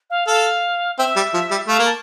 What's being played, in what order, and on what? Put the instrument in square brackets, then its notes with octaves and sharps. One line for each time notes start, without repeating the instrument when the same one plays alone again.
[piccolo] F5
[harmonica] A4 [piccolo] F5
[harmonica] C4 [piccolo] E5
[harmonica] G3
F3
G3
[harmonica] A3 [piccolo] F5
[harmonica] A#3
[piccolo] A5